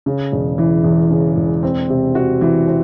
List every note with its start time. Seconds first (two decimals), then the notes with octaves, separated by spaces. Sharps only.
0.06 C#3
0.32 E1
0.58 E3
0.84 E2
1.11 C#3
1.37 E1
1.63 C4
1.89 C3
2.15 F#4
2.41 E3
2.67 C4